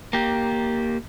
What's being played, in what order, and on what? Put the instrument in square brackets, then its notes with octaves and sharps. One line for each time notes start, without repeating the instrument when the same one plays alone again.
[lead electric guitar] A#3 G4